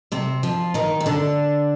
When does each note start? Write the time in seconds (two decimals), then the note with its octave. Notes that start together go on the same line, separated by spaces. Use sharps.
0.12 C3 C4
0.43 F3 F4
0.74 D#3 D#4
1.00 C4
1.06 D3 D4